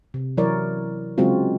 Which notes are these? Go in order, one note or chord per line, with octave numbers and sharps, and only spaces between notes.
C3
E3 F#3 E4 A#4 C#5 D5
C#3 F#3 G#3 C4 F4 F#4